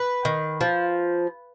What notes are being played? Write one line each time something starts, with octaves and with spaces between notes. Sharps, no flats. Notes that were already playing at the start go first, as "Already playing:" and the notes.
Already playing: B4
D#3
F3